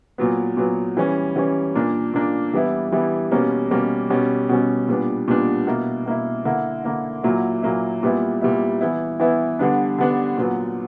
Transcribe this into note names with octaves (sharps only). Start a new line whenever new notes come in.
A#2 F#3 B3
A#2 F#3 B3
E3 G3 C#4
E3 G3 C#4
A#2 A#3 D4
A#2 A#3 D4
E3 G3 B3 E4
E3 G3 B3 E4
B2 G3 A#3 C#4
B2 G3 A#3 C#4
B2 G3 C#4
B2 G3 C#4
A#2 G3 B3 D4
A#2 G3 B3 D4
B2 A#3 E4
B2 A#3 E4
D3 A#3 E4
D3 A#3 E4
A#2 F#3 A#3 E4
A#2 F#3 A#3 E4
A#2 G3 B3 E4
A#2 G3 B3 E4
E3 B3 E4
E3 B3 E4
D3 G3 B3 D4
D3 G3 B3 D4
A#2 F#3 B3